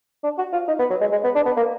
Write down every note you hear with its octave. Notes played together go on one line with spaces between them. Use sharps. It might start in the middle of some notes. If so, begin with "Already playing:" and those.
D4
F#4
F4
D#4
B3
F#3
G#3
G#3
B3
D4
B3
A#3